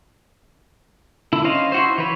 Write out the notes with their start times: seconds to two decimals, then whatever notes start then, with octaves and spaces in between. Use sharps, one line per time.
1.33 D3 E4
1.44 C#4 C5 D#5 F5
1.72 E4 F#4 C5
1.98 E3 B4 C#5